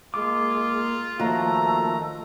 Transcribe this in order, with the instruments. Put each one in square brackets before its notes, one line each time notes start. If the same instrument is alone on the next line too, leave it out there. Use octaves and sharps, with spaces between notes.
[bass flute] G#3 [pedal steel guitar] A#3 D6 [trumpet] F4
[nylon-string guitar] D#2 [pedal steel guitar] F3 A#3 F#4 [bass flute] A3 [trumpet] A#5